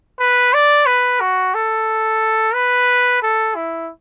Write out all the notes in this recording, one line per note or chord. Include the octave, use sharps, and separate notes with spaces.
B4
D5
B4
F#4
A4
B4
A4
E4